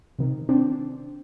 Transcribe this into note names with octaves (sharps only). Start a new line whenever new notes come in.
C3 D#3
C4 D4